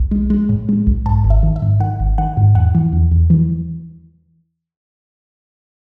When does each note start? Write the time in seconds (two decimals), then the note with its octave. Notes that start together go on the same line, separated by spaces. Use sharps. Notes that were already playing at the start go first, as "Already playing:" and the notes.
Already playing: B1
0.11 G#3
0.30 G#3
0.49 A2
0.69 G#3
0.87 B1
1.06 G#2 A5
1.24 G#1
1.30 E5
1.43 D#3
1.56 E5
1.62 G#2
1.80 D#3 F#5
2.00 G#1
2.18 D#3 F#5
2.37 G#2
2.55 E2 F#5
2.75 E3
2.93 E2
3.11 E2
3.30 E3